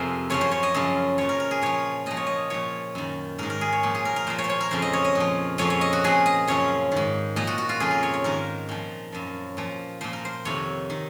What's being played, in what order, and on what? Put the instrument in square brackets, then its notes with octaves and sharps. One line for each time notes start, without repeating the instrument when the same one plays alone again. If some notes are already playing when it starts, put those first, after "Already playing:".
Already playing: [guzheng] F2 C3 F3 G#4 A#4 C5
F#2 C#3 F3 C#5
C5
C#5
D#5
F#2 C#3 F3
A#2 F3 C#5
A#4
A#4
G#4
A#2 F3 C#5
A#2 F3 D#5
C#5
D#5
A#2 F3 C#5
F#2 D#3
G#2 D#3 A#4
A#4
G#4
C#5
A#2 F3
G#4
A#4
A#4
A#2 F3 C5
C#5
C5
C#5
A#4
F2 C#3 F3 C5
D#5
C#5
D#5
A#2
F3
F2 C#3 F3 C#5
C#5
D#5
F#4
A#2 F3 G#4
D#5
F#2 C#3 F3 C#5
G#2 D#3
A#2 F3 D#5
F#4
F#4
F4
F2 C#3 F3 G#4
A#4
C#5
C#5
G#2 D#3 A#4
A#2 F3
F#2 F3
A#2 F3
A#2 F3 C5
A#4
C5
F2 C3 D#3 C#5
D#3